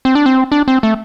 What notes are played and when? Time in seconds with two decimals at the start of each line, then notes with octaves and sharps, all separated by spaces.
0.05 C4
0.15 D4
0.26 C4
0.52 D4
0.68 C4
0.83 A3